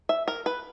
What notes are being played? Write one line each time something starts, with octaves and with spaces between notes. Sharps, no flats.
E5
A#4
B4